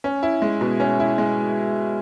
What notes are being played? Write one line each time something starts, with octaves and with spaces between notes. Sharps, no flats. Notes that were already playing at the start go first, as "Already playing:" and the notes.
C#4
E4
G#3
B2
C#4
E4
G#3